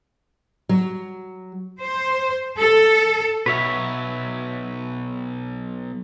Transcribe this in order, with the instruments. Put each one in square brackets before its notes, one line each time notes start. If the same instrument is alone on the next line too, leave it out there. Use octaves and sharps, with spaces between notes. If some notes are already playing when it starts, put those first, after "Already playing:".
[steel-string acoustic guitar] F#3
[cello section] C5
A4
[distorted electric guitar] B1 [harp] F#4 [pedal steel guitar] B4 C#5 E5